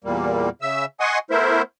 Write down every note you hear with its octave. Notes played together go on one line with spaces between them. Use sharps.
E2 A#2 G3 A#3
C#3 E5 E6
D#5 F#5 G#5 C6 C#6 D#6
A3 B3 E4 A#4 C5 E5